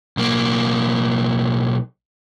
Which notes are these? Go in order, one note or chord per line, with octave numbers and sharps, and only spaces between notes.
B1 A#3